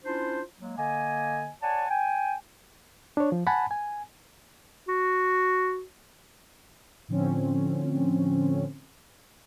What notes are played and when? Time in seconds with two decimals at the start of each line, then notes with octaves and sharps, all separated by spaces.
0.05 C#4 D4 E4 F4 C5
0.59 F#3 G#3 A#3
0.77 D3 A#3 D#5 G#5
1.62 C#5 D5 F#5 G#5 A5
1.89 G5 G#5
3.17 D4 C#5
3.32 F3
3.47 F#5 G#5 A5 B5
3.71 G#5
4.88 F#4
7.08 A2 D3 F3 C4 C#4